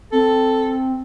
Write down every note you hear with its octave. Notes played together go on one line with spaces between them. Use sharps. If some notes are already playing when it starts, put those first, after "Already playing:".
C4 A4